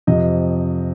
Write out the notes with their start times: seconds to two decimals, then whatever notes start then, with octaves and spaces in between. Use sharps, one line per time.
0.07 F2 C3 F3 D#5